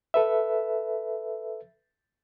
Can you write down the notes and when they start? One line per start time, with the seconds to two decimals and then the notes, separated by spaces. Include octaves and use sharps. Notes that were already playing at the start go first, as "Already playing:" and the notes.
0.14 A4 B4 E5